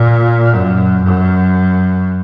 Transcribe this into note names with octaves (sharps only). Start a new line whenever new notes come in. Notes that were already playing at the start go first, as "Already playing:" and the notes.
Already playing: A#2
F#2
F#2